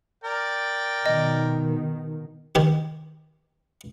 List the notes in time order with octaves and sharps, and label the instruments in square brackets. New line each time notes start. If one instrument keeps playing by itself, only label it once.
[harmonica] A#4 D5 G5
[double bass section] B2 D#3 [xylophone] D#5
[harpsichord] D#3 G4